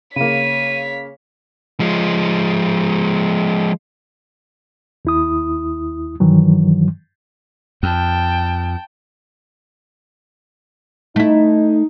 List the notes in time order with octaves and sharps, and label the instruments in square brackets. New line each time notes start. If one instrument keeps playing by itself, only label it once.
[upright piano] C#3 A#3 [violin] C#5 B6 [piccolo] D#7
[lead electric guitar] F3 G#3
[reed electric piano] D#2 E4 D#6
G2 D#3 E3 F#3
[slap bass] F2 [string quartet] G5 A5
[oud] A3 E4 [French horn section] D#4